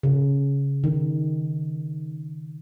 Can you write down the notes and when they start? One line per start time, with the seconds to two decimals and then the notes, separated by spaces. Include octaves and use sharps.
0.03 C#3
0.84 D#3